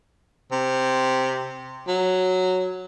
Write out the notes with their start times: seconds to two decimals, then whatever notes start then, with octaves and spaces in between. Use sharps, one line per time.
0.52 C3
1.88 F#3